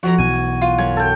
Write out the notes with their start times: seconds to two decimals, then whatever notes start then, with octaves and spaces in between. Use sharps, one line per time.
0.03 F2 C4 F#4 A#5
0.18 B1 B2 E3 G#5
0.62 F4
0.78 F#2 G#5
0.97 A4 G5